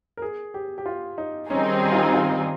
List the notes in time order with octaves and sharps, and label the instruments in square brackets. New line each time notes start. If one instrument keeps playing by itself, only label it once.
[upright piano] A#4
G#4
G4
G4
F4
D#4
[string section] D#3 G3 C4 D#4 G#4 [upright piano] C#4
[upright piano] G4
F4
F4